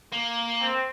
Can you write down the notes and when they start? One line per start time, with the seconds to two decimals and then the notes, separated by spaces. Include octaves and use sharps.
0.12 A#3
0.61 C4